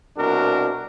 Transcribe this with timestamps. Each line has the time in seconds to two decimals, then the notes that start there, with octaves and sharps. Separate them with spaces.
0.17 C2 B2 D4 F#4 A#4